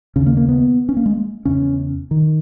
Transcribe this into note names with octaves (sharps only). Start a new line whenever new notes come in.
D#2 C#3 C#4
A#3
A#3
B3
C#4
A#3
G#3
E2 C#3 C#4
D#3